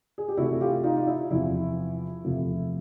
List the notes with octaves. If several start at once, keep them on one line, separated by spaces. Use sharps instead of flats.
G#4
G4
C3 E3 A3 E4 F#4
F4 G4
D#4 F4
F4
E4
E2 C3 F3 E4
E2 C3 F3 A3